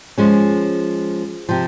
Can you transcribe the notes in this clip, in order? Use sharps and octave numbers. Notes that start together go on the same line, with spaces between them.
F3 G#3 C#4
C3 F3